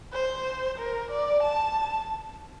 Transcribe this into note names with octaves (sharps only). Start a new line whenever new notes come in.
C5
A#4
D5
A5